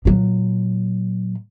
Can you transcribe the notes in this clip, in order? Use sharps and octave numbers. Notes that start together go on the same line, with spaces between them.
A#2 F#3